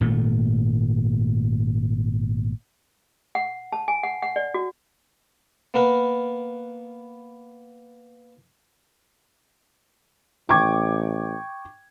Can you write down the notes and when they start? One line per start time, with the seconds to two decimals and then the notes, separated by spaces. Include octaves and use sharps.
0.01 G#1 A#2 A3
3.35 F#5
3.72 A5
3.88 G#5
4.03 F#5
4.22 F#5
4.36 D5
4.54 F#4
5.74 A#3 B3 A#4 B4
10.49 A1 G5 C#6 D6 G#6